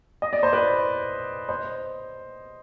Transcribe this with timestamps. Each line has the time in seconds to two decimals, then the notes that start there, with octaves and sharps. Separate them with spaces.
0.22 D#5
0.33 D5
0.43 C5
0.53 B4 D5
1.49 C5 D#5